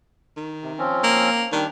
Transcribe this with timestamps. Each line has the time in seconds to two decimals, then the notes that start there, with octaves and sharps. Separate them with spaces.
0.37 D#3
0.62 C3
0.79 F3 C4 C#4
1.04 A#3
1.52 D#3 G3 D4